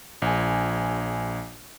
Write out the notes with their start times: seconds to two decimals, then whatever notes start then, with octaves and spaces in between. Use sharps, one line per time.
0.22 A#1 G#5